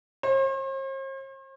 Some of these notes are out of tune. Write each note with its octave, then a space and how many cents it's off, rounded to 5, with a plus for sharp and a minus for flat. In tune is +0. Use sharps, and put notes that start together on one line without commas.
C5 +45